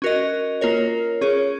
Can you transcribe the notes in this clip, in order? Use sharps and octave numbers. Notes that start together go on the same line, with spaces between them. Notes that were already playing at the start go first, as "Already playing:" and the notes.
C#4 F#4 A#4 D#5
A#3 F4 A#4 C#5
C#4 G#4 C#5